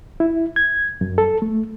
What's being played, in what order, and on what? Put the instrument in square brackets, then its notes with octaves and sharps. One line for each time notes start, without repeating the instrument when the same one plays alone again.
[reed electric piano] E4
G#6
F#2
A4
A3